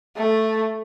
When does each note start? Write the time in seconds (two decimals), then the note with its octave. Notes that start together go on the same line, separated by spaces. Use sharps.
0.17 A3